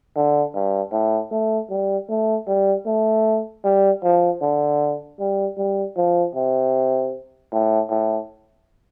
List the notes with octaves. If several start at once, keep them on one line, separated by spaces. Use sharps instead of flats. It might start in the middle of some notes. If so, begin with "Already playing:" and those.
D3
G2
A2
A3
G3
A3
G3
A3
G3
F3
D3
G3
G3
F3
C3
A2
A2